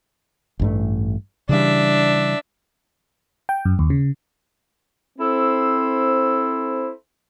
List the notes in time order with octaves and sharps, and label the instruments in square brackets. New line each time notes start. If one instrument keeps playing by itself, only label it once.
[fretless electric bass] A1 G2 A3
[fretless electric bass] C#3 E3 G3 [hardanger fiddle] D4 E5
[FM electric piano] G5
F#2
D#2
C#3
[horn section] C4 E4 A4 C5